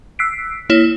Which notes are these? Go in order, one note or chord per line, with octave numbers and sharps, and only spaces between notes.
E6 F#6 B6 C7 D7
A#3 E4 C#5 E7